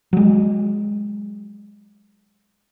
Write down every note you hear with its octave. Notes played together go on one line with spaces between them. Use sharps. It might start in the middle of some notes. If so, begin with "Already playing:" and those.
F#3 G#3